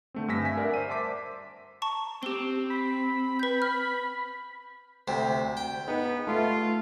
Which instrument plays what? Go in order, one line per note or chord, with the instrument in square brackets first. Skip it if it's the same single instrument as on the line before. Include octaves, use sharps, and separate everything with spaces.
[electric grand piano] D3 A3 C4
G2 G#5 E6 A#6 B6
E5 G#5 B6
A#4 D5 E5 F#5
C5 D#7
E5 A5 C6 D6 B6
[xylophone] A5 A#5 C#6
[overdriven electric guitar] C4 [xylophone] G4 G7
[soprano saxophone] B5
[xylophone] B4 G6
F6
[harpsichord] D2 C3
G5
[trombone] B3 [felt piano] D#4 B4
[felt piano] A3 E5 [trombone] F4